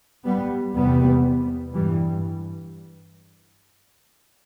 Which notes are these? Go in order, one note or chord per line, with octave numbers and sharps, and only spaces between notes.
G3 B3
E2 C3 G3 B3
G2 E3 G3